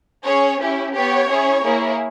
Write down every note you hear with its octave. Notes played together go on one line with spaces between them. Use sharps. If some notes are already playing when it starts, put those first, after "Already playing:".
C#4 G#4 C#5
C#4 E4 G4
B3 G4 C#5
C#4 E4 G#4
A#3 E4 G#4